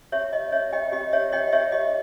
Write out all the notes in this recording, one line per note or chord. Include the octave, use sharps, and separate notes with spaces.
G4 C#5 E5
C#5 D#5
C#5 E5
G4 D#5 G5
G4 D#5
C#5 E5
C#5 D#5 G5
G4 C#5 E5
G4 D#5